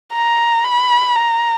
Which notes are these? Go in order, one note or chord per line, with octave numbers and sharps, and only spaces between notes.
A#5
B5
A#5